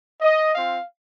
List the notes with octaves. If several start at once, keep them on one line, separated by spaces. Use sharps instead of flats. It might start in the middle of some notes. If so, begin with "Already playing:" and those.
D#5
C4 F4 F5